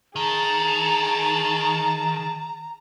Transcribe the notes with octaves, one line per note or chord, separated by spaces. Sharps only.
D#3 G#4 A5 A#5